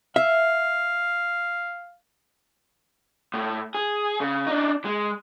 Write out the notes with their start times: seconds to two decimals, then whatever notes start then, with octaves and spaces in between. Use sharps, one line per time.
0.16 E5 F5
3.34 A2
3.75 G#4
4.21 C#3
4.47 D4 D#4
4.85 G#3